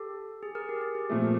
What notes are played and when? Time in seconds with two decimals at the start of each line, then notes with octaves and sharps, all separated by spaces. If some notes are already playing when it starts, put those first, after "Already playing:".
Already playing: G4 A4
0.43 G#4
0.55 G#4 A#4
0.69 G4
0.81 G#4
0.95 G4
1.10 A#2 F3 A3